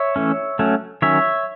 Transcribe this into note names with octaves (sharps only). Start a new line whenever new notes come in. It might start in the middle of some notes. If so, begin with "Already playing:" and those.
Already playing: C#5 E5
E3 A3 C#4
F#3 A3 C#4
D#3 F#3 C#4 C#5 E5